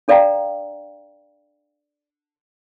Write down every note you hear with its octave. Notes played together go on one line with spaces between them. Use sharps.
D4 A4 D5 F5 G5 A#5